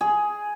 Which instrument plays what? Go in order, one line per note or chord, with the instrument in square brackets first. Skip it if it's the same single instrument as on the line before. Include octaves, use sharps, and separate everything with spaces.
[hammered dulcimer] G#4